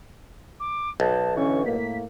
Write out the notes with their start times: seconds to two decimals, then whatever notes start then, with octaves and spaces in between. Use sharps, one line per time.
0.60 D6
1.00 B1 A5
1.36 D3 E3 C#4 C#6
1.65 A2 A#3 B6